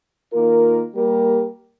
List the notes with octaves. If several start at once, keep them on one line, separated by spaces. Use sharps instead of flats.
D#3 A#3 F4 A#4
G3 A#3 G4 A#4